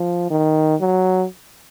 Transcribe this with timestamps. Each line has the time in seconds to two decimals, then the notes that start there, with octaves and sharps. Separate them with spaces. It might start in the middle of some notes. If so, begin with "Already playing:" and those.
Already playing: F3
0.30 D#3
0.81 F#3